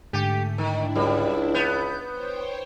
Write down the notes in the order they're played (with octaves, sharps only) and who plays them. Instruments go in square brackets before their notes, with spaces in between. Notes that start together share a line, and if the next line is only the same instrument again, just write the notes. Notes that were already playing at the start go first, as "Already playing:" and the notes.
[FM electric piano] G#2 D3 G5 [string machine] A3 [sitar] G4
[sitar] D#3 [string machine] D4 E4
[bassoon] C#2 [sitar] G3
[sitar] B3 [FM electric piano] G6
[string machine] C5 C#5 G5